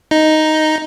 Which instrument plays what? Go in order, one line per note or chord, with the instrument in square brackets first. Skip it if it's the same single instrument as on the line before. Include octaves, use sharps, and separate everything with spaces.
[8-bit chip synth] D#4